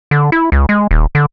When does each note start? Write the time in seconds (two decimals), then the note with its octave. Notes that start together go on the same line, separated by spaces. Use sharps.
0.11 D3
0.32 E4
0.52 C#2
0.69 G#3
0.91 D#1
1.15 D3